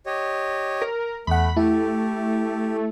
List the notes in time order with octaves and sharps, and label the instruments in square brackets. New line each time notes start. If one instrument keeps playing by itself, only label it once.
[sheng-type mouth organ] G4 C#5 D#5
[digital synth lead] A#4
[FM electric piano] E2 F#5 [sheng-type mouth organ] A3 [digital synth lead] B5
[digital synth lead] A3 [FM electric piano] E4 [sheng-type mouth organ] G4